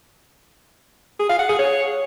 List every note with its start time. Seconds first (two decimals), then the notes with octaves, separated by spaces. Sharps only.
1.19 G#4
1.29 F5
1.39 F#5
1.49 G#4
1.59 C#5